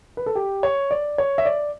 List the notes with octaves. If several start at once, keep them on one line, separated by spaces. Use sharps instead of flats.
B4
A4
G4
C#5
D5
C#5
E5
D5